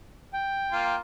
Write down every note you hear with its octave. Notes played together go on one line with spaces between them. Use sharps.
G5
A#3 F4